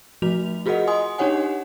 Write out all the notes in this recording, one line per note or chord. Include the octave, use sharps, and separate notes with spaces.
F3 A3 F#4 F7
F4 F#4 G#4 A#4 D#5 F#5
D#5 G#5 C6 D#6
D4 D#4 G4 C#5 F#5 G#5